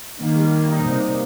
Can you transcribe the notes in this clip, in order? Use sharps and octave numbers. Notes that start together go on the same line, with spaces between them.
D#3 A#3
G3
A#3
D#4
C3 D#4